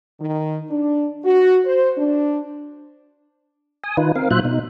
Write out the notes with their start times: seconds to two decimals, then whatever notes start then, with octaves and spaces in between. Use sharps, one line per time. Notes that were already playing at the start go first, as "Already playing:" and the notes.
0.19 D#3
0.69 D4
1.23 F#4
1.64 C5
1.97 D4
3.84 G#5 D#6
3.97 D#3 D#4 F4 B4
4.15 C4 A#4 F5
4.31 A#2 F#3 F4 C5 E5 F#6
4.45 B2 D#4